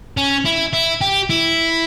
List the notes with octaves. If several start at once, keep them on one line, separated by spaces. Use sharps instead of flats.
C#4
E4
E4
G4
E4